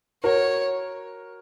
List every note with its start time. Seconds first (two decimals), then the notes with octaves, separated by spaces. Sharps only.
0.24 F#4 A#4 C#5